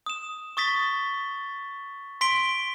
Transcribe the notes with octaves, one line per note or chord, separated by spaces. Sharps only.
D#6 E7
C#6 D#6 A6 B6 G7
C6 B6 D7 G7